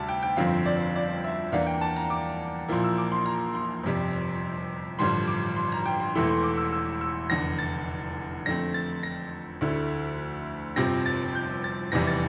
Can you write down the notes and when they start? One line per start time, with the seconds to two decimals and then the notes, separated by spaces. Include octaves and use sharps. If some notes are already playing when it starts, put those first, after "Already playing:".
Already playing: D2 C3 G3 A5
0.09 G5
0.23 G5
0.37 G1 F2 D3 F3 C4 F5
0.66 D5
0.96 D5
1.24 E5
1.52 E2 E3 A#3 D4 F5
1.67 G5
1.81 A5
1.96 A#5
2.10 D6
2.68 A#1 A#2 F3 A#3 E4
2.84 E6
2.98 D6
3.12 C6
3.26 A#5
3.55 C6
3.83 G1 F2 C3 G3
4.99 A1 G2 D3 F3 C6
5.28 D6
5.56 C6
5.72 A#5
5.86 G5
6.00 C6
6.15 E1 E2 E3 A3 E4 C6
6.29 C6
6.43 D6
6.58 E6
6.72 E6
7.01 E6
7.30 F1 E2 D3 A#6
7.59 A6
8.46 F2 D3 A3 C4 A#6
8.74 A6
9.03 A#6
9.61 D2 D3 A3 E4
10.76 G1 F2 C3 F3 C4 A#6
11.06 A6
11.35 G6
11.64 A6
11.92 F1 E2 C3 E3 G3 A#6
12.07 A6